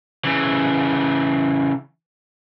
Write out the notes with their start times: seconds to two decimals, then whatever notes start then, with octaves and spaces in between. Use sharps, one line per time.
0.24 C#3 E3